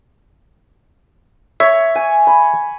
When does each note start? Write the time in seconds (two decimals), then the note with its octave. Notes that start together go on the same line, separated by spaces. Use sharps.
1.60 C#5 E5
1.95 G#5
2.27 B5